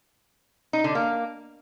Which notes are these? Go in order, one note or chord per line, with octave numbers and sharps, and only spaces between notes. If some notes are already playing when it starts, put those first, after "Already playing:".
D#4
D3
A#3